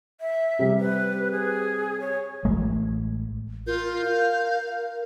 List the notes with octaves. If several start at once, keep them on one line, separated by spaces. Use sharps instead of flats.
E5
C3 G3
B4
G#4
C#5
A1 G#3 A3
F4 A#4 G6
F5